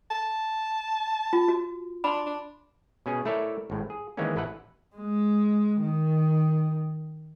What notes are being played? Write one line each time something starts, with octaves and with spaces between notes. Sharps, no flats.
A5
F4
F#4
D4 B5 C6
D4
B2 C#4 G#4
A3 E4 A4 A#4 C#5 D5
G#1 A2
G#4
D#3 E3 G#3 A#3 C4 C#4
A1 E4 A4 B4 F#5
G#3
D#3